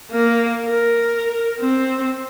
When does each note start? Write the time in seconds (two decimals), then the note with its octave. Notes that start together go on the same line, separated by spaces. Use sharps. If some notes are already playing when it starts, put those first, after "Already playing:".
0.11 A#3 A#4
0.67 A#4
1.60 C4